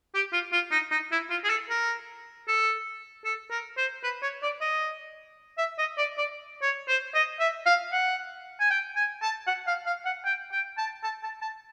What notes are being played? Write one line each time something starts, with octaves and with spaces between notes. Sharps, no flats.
G4
F4
F4
D#4
D#4
E4
F4
G#4
A4
A#4
A4
A4
A#4
C5
B4
C#5
D5
D#5
E5
D#5
D5
D5
C#5
C5
D#5
E5
F5
F#5
G#5
G5
G#5
A5
F#5
F5
F5
F#5
G5
G5
A5
A5
A5
A5